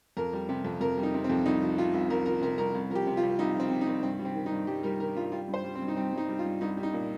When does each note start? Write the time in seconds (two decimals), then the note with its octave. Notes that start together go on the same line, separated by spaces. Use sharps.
0.17 F2 A#4
0.33 G3
0.49 C3
0.64 F2
0.81 F2 A#4
0.98 G3
1.03 D#4
1.14 C3
1.24 C4
1.30 F2
1.46 C2 D#4
1.61 F3
1.78 C3 F4
1.94 C2
2.10 C2 A#4
2.26 F3 A#4
2.42 C3 A#4
2.58 C2 A#4
2.74 C2
2.90 F3 A#4
2.95 G4
3.07 C3
3.17 F4
3.23 C2
3.39 C2 D#4
3.55 F3 C4
3.70 C3
3.81 D#4
3.87 C2
4.03 G2 C4
4.19 G3
4.25 C4
4.35 D#3
4.46 D#4
4.51 G2
4.67 G2 G4
4.83 G3 A#4
4.99 D#3 A#4
5.16 G2 F4
5.32 G3 F4
5.48 G2
5.54 C5
5.64 G3
5.75 C4
5.81 G2
5.88 D#4
5.97 G3 C4
6.13 G2 D#4
6.29 G3
6.39 F4
6.44 G2
6.61 C2 D#4
6.77 G3
6.83 D#4
6.93 A#2